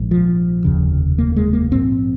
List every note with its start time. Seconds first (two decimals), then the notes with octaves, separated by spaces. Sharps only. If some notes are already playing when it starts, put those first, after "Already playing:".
Already playing: A#1 G#2
0.11 F3
0.64 F1 D#2 C#3
1.18 A#3
1.36 G#3
1.53 A#3
1.71 A#1 G#2 C4